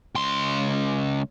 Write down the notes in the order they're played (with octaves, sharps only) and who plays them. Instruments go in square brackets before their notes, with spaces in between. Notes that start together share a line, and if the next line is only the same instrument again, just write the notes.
[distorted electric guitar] C#2 C6